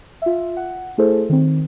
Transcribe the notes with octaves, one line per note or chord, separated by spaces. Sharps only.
F4 E5
F#5
A3 E4 G#4 A4 C5
D#3 C4